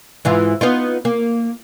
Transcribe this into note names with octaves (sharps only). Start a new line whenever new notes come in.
G#2 E3 F4
B3 D#4 F4
A#3